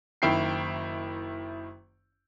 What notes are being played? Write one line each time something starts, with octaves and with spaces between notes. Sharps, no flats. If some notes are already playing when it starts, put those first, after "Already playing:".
F#1 D#3 E4 G5 C7